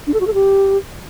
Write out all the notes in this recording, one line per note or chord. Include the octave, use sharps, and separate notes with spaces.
D4
A4
F#4
A4
G4